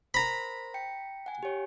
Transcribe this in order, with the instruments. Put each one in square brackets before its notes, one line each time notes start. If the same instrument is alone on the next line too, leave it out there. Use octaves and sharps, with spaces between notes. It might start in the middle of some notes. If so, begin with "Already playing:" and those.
[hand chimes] A#4 C5 [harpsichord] A#5 B5
[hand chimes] G5 C#7
F#5 G#5
G4 C#5